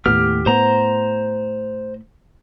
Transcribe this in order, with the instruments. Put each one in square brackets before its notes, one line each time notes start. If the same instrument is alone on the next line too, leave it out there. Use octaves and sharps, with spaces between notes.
[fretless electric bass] D#2 A2 B3 [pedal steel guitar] G4 F6
[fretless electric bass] A2 B3 [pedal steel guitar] C5 A#5